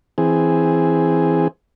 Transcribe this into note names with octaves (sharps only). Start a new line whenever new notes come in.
E3 C4 G#4